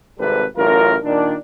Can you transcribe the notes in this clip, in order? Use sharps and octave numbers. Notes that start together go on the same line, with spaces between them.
G#1 C3 G3 A4 B4
A1 F#2 F4 A#4
A#2 D#3 D4